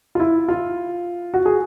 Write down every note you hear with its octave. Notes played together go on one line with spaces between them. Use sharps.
F4
E4
F4
F#4
G#4